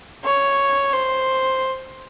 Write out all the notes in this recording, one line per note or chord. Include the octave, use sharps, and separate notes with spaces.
C#5
C5